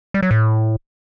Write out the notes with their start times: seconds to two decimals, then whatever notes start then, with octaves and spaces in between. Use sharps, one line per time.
0.14 G3
0.23 F#3
0.31 A2